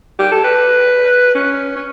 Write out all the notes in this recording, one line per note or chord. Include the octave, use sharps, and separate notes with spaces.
G4
A4
B4
C#4
C#4